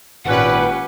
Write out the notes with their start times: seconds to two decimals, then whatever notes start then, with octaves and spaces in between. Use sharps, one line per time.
0.25 G#1 A#2 C#4 G4 B4 F#5